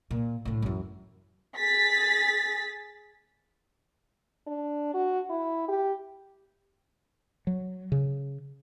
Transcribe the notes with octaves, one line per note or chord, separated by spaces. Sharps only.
A#2
A2 D3
F#2 E3
G#4 A6 B6
D4
F#4
E4
G4
F#3
C#3